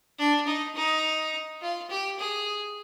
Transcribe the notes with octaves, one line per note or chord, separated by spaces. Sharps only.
D4
D#4
D#4
F4
G4
G#4